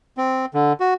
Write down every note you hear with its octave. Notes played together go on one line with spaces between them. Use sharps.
C4
D3
F#4